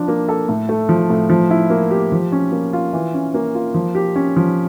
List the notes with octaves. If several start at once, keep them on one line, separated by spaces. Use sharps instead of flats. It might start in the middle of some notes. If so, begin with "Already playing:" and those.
Already playing: F3 D4
A#3
A4
A2
A3
F3
A2
F3
E4
A#3
G4
F3
C#4
A#3
F4
E3
C#4
A#3
F4
F3
G4
C#4
F3